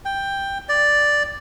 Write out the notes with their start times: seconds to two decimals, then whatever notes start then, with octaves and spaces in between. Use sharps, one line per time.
0.05 G5
0.69 D5